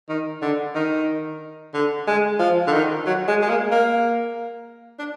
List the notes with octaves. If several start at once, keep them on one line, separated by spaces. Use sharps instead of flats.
D#3
D3
D#3
D3
G#3
F3
D3
D#3
F#3
G#3
G#3
A#3
A#3
D4